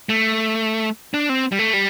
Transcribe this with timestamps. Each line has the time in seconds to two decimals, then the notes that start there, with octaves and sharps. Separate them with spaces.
0.09 A3
1.14 D4
1.29 C4
1.52 G3
1.59 A3
1.73 G3